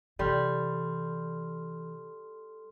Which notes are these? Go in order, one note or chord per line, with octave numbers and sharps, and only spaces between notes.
C3 E3 G3 A4 C6 F6